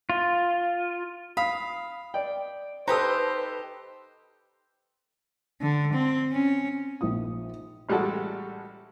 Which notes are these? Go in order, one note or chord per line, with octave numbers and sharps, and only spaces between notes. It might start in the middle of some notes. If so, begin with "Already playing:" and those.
F4
F5 B5 D#6
D5 G5
D#4 G4 A4 B4 C5 D#6
D3
C4
C#4
A#1 D#4 F4 D#6
A1 G3 G#3 F#4 A4